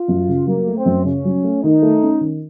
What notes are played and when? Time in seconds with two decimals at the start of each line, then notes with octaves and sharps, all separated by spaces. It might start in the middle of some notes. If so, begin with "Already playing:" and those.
Already playing: F4
0.08 F#2
0.29 C#3
0.47 F#3 A#3
0.67 A3
0.77 C4
0.86 F#2
1.05 C#3 C#4
1.25 F#3
1.44 A3
1.63 D#3 D#4
1.82 A3
2.02 C#4
2.21 D#3